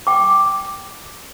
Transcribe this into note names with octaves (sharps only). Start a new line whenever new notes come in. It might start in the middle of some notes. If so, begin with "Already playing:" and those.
G5 D6